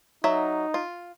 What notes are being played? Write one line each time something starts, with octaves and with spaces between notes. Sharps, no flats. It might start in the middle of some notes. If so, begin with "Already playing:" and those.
F#3 D#4 E5
F4